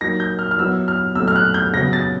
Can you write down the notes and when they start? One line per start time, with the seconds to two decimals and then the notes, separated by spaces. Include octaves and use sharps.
0.01 F#3 A#3 D#4 A#6
0.20 G6
0.39 F6
0.51 F6
0.58 F#3 B3 E4 E6
0.88 F6
1.15 B2 F#3 A3 E6
1.28 F6
1.36 F#6
1.54 G6
1.73 C#3 F#3 B3 A#6
1.93 A6